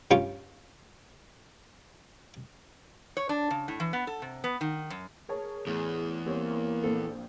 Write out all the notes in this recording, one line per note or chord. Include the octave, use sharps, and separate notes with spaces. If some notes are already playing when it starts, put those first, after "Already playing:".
G2 C#4 F4 G5 C#6
C#5
D4
C#3
A2
E3
B3
A4
C3
B3
D#3
F#2
G#4 A#4 C#5 A5
E2 A2 G#4
G3 A#3 C4 C#5
A#1 A#2 C4 A4